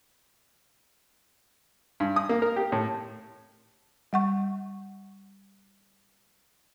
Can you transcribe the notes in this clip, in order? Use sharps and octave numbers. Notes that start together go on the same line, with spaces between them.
G2
D#6
A#3
A#4
G4
A2
G3 F#5 C#6